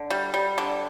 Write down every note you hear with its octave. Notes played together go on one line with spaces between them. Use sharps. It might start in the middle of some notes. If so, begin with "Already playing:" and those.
Already playing: D3
G3
G3
D3